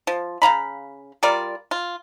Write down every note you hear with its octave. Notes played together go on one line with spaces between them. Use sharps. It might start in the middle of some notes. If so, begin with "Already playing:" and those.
F3
C#3 F5 A#5 B5
G3 F4 A#4 D5
F4